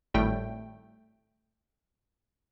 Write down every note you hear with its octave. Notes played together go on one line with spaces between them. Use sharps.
G#1 A2 G3 A3 G5